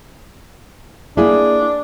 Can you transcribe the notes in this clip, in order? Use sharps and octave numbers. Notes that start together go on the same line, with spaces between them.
A#3 D4 E4 G#4